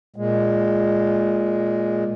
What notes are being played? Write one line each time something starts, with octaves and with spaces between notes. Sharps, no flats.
A#2 G#3